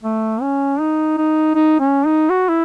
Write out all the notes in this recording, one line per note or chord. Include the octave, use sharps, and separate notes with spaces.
A3
C#4
D#4
D#4
D#4
C#4
D#4
F#4
E4